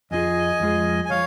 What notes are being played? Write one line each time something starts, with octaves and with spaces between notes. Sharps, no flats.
F2 F3 G#3 F4 G#4 D#5 G#5
F2 F3 G#3 F4 G#4
G#5
F3 G#3 C#5 F5